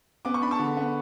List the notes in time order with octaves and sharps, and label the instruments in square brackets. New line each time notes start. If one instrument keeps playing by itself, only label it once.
[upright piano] B3 D6
C#6
D4 B5
A5 C#6
D3
B3